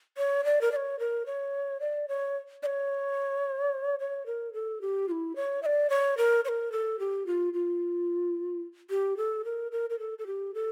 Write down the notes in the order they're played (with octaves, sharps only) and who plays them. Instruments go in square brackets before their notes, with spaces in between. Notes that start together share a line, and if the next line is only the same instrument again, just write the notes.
[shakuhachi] C#5
D5
A#4
D5
C#5
A#4
C#5
D5
C#5
D5
C#5
C#5
A#4
A4
G4
F4
E4
C#5
E5
D5
C#5
A#4
C#5
A#4
A4
G4
F4
F4
G4
A4
A#4
A#4
A#4
A4
A4
G4
A4